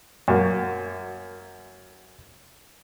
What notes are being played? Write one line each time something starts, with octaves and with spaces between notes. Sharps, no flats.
F#2 A#3